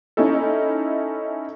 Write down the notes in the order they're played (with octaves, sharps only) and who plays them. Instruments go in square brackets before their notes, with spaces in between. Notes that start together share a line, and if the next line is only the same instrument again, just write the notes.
[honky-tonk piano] C#4 D#4 E4 A4